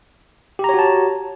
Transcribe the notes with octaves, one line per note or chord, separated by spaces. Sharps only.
F#4 G4 C#5 A5 A#5